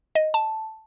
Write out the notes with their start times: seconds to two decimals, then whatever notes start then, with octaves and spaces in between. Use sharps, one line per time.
0.15 D#5
0.34 A5